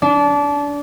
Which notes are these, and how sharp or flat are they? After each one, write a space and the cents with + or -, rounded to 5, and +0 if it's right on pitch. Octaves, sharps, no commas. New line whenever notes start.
D4 -25